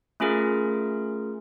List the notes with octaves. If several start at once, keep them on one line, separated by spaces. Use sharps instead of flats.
A3 C#4 F4 G#4 A#4